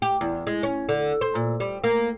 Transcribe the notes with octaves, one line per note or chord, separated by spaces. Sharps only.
G4
E2
G#3
C#4
D3
C5
A#2
G3
A#3